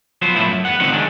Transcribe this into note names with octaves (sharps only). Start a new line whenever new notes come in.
F3 F#3 B3 C5
C2 A2 F3 A3 E4
F#2
E2 D#3 B3 F#5
A2 D3 D#3 F3 C4 F#5
D#3 F#3 G#3 C#4 D4